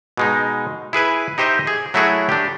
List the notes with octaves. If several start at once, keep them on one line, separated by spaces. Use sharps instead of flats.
B2 G#3 D#4
E4 G#4 B4 G#5
D#4 G4 C5 D#5 E5
G#4
F#3 A3 E4 F#4 G#4
D4 G4